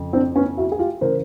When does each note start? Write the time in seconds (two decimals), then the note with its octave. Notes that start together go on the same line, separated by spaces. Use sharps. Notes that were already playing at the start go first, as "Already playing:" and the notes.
Already playing: F2 C#3
0.13 C4 D4
0.36 B3 C#4
0.57 E4 F#4
0.72 G#4
0.79 F4 G4
1.01 C#3 E3 A#4 C5